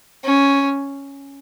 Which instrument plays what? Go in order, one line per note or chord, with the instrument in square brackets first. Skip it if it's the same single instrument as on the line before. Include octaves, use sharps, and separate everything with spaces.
[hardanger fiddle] C#4